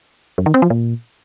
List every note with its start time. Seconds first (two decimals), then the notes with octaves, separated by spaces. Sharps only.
0.38 F#2
0.46 D#3
0.54 C4
0.62 F3
0.70 A#2